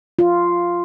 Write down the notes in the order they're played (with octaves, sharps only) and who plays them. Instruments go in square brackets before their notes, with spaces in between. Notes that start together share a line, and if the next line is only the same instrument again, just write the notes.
[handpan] F4